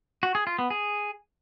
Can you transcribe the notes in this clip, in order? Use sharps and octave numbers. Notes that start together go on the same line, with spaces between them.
F#4
G#4
F4
B3
G#4